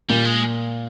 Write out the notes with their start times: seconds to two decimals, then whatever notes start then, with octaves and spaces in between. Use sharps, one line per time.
0.10 A#2 G3
0.25 G#3